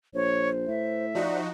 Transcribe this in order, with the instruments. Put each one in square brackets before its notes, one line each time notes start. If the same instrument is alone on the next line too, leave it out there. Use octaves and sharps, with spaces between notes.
[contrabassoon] A#1 [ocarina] C5 [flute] C#5
[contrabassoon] A2 [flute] E5
[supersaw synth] F3 D#4 F#4 [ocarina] D5